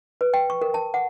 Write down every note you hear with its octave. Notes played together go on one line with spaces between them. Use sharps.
B4
G5
C#6
A#4
A5
F#5